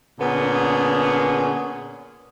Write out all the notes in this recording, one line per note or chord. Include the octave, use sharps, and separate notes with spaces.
A#2 D3 B3 C#4 G#4